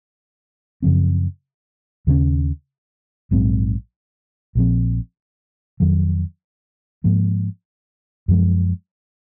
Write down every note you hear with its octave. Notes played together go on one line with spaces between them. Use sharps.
F#2 C#3 F3 C4
D#2 C#3 G#3 C#4
A#1 G#2 F#3 C4
A#1 A#2 F3 C4
F2 D#3 F#3
G#2 F3 A#3
F#2 F3 G#3